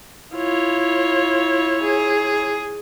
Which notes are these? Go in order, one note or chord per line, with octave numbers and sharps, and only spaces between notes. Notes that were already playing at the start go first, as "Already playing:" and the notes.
E4 F4 C#5
G#4